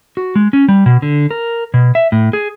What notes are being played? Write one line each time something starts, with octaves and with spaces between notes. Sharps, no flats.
F#4
G#3
C#4
G3
B2
D3
A#4
B2
E5
A2
G#4